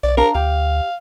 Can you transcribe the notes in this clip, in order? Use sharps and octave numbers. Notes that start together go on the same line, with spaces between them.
B1 D5
D4 A#4 F5 A#5
D2 G4 F5